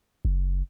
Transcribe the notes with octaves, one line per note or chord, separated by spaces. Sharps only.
F#1